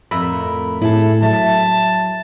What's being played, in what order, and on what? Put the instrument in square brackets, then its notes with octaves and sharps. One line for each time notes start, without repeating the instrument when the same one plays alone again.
[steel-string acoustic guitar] F2 A2 A#4 [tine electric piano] B5 E6
[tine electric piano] A2 [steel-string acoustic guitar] E4 G#4 A4
[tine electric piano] F#3 [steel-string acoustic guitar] E5 [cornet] A5